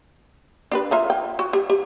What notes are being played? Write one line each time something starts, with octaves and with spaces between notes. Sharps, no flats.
D4 G4 B4
F4 E5 A#5
G5
F#4
G4
G4